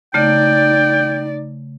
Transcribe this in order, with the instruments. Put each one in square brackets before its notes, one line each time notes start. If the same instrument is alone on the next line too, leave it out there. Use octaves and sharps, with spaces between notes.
[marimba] C#3 A3 [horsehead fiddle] D#4 D5 [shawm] G5